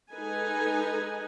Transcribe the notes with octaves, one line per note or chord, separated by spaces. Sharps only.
G#3 D#4 A4 B4 G#5